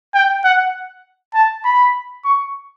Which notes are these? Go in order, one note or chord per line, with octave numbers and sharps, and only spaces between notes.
G5
F#5
A5
B5
C#6